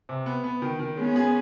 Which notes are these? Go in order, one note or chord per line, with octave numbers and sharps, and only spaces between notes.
C3
B3
B3
D#3
D#3
G#3 B3 C#4
G#4